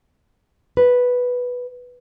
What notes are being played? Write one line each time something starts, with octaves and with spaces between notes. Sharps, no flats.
B4